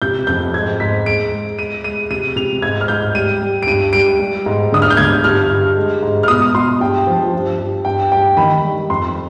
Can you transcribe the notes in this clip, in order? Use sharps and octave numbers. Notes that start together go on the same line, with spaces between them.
C3 G6
F2 G6
G#2 G#6
G#2 B6
G#3 D7
G#3
G#3 D#7
G#3 D#7
C3 D#7
C3 F7
G#2 G#6
F6
G#2 G6
G3 D#7
G3
D7
G2 D#7
G3 D7
G3
G#2
D3 D#6
F6
G6
D3 G#6
G2 F6
G2
G#3
G#2
F6
B2 D#6
B2 C6
G2 G5
F3
G2
G2
G2 G5
G2 G5
D#3 B5
G3
F2 C6